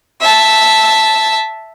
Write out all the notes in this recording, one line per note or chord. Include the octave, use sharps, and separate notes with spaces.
E5 A5